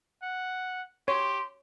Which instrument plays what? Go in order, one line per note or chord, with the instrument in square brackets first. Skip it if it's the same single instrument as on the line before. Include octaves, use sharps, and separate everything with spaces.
[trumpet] F#5
[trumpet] G4 [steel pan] C#5 [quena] C6